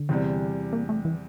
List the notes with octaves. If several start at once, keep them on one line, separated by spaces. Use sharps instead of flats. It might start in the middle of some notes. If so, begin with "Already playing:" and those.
Already playing: D3
E2 C3 G3
A#3
A3
E3